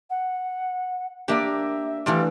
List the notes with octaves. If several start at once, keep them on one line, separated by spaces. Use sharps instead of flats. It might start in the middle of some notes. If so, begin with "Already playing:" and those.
F#5
A#3 D4 G4 A#4 D5 E5
E3 F3 G3 A3 D4